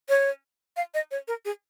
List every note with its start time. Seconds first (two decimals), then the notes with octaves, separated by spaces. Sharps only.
0.09 C#5
0.77 F5
0.94 D#5
1.11 C#5
1.28 A#4
1.45 G#4